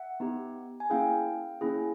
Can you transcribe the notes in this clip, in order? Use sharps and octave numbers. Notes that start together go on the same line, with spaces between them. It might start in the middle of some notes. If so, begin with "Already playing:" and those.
Already playing: E5 F#5
B3 D#4 G4
G#5
A#3 C#4 E4 G#4 F5 G5
A#3 C#4 E4 G#4